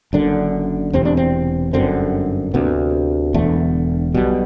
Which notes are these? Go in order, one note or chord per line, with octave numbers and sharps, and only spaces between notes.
F#1 F#2 D3 D4
E1 E2 C3 C4
D4
C4
G1 F#2 D3 C4
D2 C3 B3
E1 E2 D3 A3
B1 B2 G3